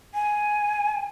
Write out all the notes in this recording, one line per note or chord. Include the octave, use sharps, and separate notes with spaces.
G#5